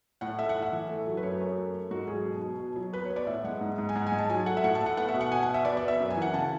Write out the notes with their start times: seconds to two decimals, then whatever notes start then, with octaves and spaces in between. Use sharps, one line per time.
0.21 A2 F#5
0.39 A3 E5
0.49 F#5
0.54 A2
0.62 E5
0.72 E3
0.89 A3
1.06 F#3
1.17 B4
1.23 F#2 C#5
1.41 F#2
1.57 A3
1.74 A3
1.91 G#2 F#4
2.08 F#3 G#4
2.25 B2
2.42 B2
2.59 B2
2.76 F#3
2.93 B3 B4
3.05 C#5
3.10 B3
3.16 D5
3.27 A2 E5
3.44 G#3 F#5
3.61 G#2
3.78 G#2
3.89 G#5
3.95 G#2 F#5
4.07 G#5
4.12 G#3
4.19 A5
4.30 F#3 G#5
4.46 A3 F#5
4.57 E5
4.64 A2 F#5
4.75 A5
4.81 A3
4.86 F#5
4.97 B3 F#5
5.09 E5
5.14 B2
5.21 F#5
5.31 B2 G#5
5.43 F#5
5.49 B2
5.54 E5
5.65 B3 D5
5.77 D5
5.82 B3
5.88 E5
6.00 F#2
6.10 G#5
6.17 E3
6.22 F#5
6.33 C#3 A5